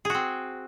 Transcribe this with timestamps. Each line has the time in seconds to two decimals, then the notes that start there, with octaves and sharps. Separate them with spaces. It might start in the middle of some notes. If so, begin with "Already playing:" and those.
0.05 G#4
0.10 F#4
0.14 C4